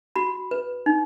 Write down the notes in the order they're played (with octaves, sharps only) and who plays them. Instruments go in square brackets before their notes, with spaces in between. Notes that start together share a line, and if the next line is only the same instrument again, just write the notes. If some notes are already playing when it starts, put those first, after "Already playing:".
[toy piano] F#4 B5
B4
D#4